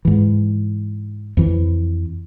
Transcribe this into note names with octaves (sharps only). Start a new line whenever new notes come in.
G#2 E3
F2 E3